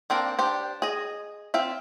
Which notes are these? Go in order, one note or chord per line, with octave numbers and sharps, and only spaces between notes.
A#3 C4 D4 A#4
D4 G4 C5
G#4 D#5
C4 F4 E5